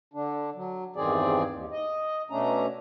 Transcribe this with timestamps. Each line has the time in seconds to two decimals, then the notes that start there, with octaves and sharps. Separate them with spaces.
0.14 D3 D4
0.55 F#3
0.96 E2 G2 D#3 C4 G#4 D5
1.50 D#2
1.72 D#5
2.30 B2 A3 C#4 D4 A#5